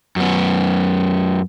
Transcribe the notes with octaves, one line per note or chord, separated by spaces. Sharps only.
F#2 B3